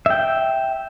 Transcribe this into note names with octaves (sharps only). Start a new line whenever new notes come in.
E5 G5